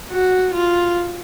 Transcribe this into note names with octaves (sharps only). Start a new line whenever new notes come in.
F#4
F4